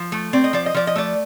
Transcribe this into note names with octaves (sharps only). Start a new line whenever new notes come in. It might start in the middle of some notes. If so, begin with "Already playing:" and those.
Already playing: F3
A3
C4 D5
D#5
F3 D5
D#5
F3 D5
D#5
A3 D5